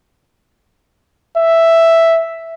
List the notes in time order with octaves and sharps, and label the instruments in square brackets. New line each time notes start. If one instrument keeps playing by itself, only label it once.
[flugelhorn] E5